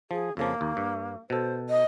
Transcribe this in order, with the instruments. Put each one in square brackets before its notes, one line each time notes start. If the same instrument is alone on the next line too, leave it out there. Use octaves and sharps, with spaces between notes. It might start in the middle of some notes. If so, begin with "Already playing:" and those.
[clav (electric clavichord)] F3 [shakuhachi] G#4
[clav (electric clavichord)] F2 C#3 F3 [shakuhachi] A#3
[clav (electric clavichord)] D#2
G2
[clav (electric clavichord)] B2 A4 [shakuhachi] C5
[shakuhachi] D#5